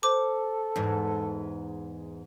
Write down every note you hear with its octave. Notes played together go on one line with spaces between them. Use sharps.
A4 C5 D6
E2 G#2